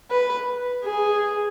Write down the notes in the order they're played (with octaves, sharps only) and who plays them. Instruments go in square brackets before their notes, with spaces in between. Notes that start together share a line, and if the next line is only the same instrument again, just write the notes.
[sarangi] B4
G#4